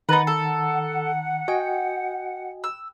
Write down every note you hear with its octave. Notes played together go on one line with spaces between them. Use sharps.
D#3 D#4 B4 F#5 A#5 A6
A4
F#4 D#5 G5 G#5
E6